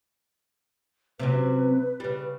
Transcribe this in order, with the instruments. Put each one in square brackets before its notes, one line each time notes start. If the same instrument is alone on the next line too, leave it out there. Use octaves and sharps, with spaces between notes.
[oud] C3 F#3 C#4 [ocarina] B4
[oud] C#3 G3